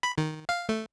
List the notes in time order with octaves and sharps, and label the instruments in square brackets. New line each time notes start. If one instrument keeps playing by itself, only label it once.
[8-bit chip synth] B5
D#3
F5
A3